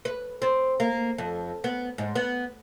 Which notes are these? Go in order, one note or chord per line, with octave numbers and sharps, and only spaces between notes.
B4
C4
A#3
F2
B3
G#2
B3